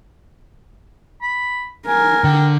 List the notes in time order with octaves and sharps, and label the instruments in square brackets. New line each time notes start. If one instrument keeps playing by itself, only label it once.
[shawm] B5
[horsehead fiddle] A#4 [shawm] G#5
[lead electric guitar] D3 [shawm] G5